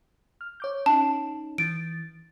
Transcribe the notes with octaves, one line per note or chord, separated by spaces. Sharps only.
F6
C#5 D6 G6
C#4 D#4 A5
E3 A6 D7